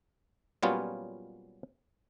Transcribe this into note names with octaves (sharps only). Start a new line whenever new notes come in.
A#2 F#3 G3 B3 C#4 F4